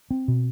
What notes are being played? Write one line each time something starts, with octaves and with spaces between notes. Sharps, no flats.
C4
B2